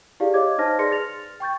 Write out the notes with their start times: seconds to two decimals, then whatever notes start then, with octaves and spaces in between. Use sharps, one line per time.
0.20 E4 G4 G#4 D5 F5
0.34 C#5 D#5 F5 D6 G#6
0.58 D#4 C5 D#5 A5 F6 A#6
0.79 G#4 B4 D5 C6 A#6 C#7
0.91 F6 A6 F7
1.40 G5 C#6 G6 A6